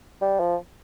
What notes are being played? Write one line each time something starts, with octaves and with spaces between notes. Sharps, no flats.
G3
F3